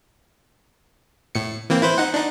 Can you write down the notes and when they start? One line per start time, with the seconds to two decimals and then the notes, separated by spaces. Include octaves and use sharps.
1.35 A2 C#7
1.70 E3 A#3 C4
1.82 E4 B4 C5
1.98 D#4 F#5
2.14 D4 D#4